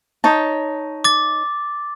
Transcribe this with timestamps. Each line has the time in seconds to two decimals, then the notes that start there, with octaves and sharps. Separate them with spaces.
0.24 D#4 C#5 A5
1.04 D6 A6